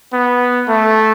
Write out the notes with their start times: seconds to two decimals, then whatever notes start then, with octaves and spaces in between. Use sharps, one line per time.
0.13 B3
0.68 A3